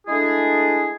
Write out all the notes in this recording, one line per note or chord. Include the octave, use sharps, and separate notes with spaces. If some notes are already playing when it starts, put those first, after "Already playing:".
G#3 A3 D4 E4 G#4